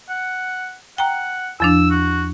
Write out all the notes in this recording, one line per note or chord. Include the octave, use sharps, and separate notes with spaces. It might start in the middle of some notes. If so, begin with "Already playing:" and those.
F#5
F#5 G5 A#5
E2 F3 D4 E6
F#4